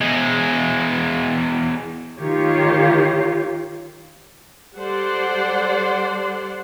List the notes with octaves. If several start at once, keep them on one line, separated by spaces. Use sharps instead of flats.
E2 G#3
D#3 F4 G4 C#5
G3 A4 C5 D5 F#5 C6